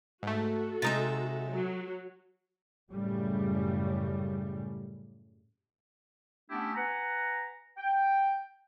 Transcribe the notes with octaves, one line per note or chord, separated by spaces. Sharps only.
G#2 A3 F#4 A4
C3 G#3 D#4 E5 A6
F#3
F#2 A2 C#3 G3
A3 B3 C#4 D4 E4 G4
B4 F#5 G#5 A#5
G5